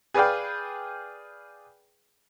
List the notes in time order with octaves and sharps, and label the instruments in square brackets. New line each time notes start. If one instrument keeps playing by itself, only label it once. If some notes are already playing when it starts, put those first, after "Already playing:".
[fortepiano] G#4 B4 D5 F5 G5